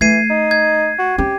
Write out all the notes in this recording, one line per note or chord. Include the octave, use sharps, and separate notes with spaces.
E3 A3 G#6 C7 D#7
D#4
G#6
F#4
C#4 G4